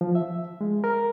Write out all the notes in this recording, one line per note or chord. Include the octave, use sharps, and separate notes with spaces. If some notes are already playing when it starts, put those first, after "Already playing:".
F3
E5
G#3
A#4